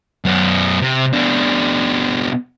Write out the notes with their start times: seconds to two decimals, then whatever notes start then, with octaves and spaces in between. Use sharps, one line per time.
0.25 F#2 B3
0.81 C3
1.13 B2 D4